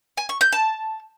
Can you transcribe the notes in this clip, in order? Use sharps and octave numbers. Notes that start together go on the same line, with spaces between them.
G#5
C#6
G6
A5